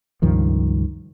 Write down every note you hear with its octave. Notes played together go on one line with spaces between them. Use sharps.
C#2 G2 D#3 F3